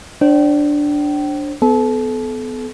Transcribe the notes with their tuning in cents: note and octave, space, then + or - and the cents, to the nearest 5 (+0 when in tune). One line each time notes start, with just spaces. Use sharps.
D4 +0 C5 +35 G5 -30
B3 +25 A4 -30